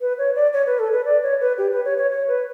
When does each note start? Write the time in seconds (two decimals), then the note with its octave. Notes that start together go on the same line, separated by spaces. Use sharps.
0.01 B4
0.18 C#5
0.35 D5
0.53 C#5
0.66 B4
0.79 A4
0.92 B4
1.05 D5
1.23 C#5
1.40 B4
1.58 G4
1.72 B4
1.85 C#5
1.98 C#5
2.11 C#5
2.28 B4